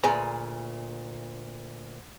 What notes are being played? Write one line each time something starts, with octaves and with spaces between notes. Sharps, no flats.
D2 A#2 G#4 B4 A#5